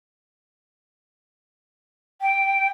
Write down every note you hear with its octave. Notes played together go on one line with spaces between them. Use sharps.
G5